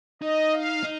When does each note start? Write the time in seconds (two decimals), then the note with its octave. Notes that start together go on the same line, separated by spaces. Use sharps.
0.22 D#4 D#5
0.53 F5
0.84 D#4